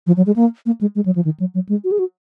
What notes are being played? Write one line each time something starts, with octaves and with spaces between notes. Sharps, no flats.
F3
F#3
G#3
A#3
A#3
G#3
G#3
F#3
F3
D#3
F#3
F#3
G#3
F#4
G#4
F#4